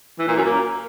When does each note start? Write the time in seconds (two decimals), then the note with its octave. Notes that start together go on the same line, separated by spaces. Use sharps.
0.19 E3
0.27 A#2
0.36 F#2
0.44 A#3